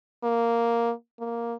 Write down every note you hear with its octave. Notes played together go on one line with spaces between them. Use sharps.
A#3
A#3